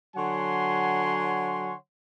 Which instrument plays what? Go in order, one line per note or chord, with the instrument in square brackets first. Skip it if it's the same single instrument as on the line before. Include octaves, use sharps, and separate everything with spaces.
[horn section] D3 F#3 C#5 F#5 G#5 C6